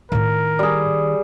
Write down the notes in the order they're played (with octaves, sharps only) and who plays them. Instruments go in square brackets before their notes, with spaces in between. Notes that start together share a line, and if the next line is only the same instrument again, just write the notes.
[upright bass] A2 E4 [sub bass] D#3 [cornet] A#4
[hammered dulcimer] G3 G#4